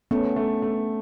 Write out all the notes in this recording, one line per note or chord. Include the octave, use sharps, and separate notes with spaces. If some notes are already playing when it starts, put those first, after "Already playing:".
A3 B3 C#4
A3
A3